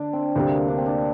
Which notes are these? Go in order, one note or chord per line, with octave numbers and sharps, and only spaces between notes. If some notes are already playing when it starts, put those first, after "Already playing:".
Already playing: D3 D4
C4
D2 C3 G3 A#3
D4
C4
D4